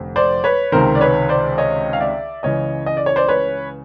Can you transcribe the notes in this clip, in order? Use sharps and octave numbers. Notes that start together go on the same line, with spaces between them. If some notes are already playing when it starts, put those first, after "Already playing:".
Already playing: F1 F2 D3
C5 D5
B4 C#5
C#2 C3 D#3 A#4 C5
D5
B4 C#5
C5 D5
C#5 D#5
F5
D5 E5
C#2 C#3 E3 C#5 D#5
D#5
D5
C#5
C5 D5
B4 C#5